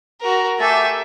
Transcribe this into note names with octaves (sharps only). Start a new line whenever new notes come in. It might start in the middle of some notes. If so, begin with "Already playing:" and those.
F#4 A#4
A3 G4 A4 E5 G#5